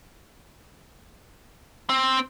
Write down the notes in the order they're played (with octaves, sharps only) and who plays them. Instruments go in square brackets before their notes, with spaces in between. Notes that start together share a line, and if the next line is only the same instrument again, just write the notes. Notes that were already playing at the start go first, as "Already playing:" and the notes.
[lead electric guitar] C4